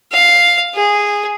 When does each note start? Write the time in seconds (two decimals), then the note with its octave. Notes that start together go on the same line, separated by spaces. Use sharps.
0.12 F5
0.75 G#4